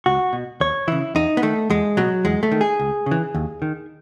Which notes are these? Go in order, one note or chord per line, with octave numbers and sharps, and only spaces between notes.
C#2 F#4
B2
D#2 C#5
C#3 E3 E4
E2 D#4
B3
D#3 A3
E2 G#3
B2 F#3
E2 G#3
A3
D#3
G#4
C#2
C#3
E3
D#2
D#3